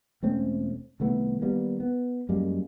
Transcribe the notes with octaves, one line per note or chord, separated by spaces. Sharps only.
E1 A3 C4 C#4
C2 D#3 A3 B3
D#3 G3 A#3 B3
B3
F#2 G3 G#3 A#3